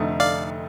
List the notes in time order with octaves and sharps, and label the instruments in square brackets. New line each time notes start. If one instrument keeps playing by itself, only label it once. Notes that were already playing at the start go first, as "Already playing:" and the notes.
Already playing: [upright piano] F1 F2 D3 A3 D#4
[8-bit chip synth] D5 F5